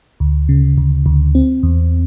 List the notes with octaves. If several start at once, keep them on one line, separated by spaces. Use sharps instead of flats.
D2
C#3
D2
D2
C4
E2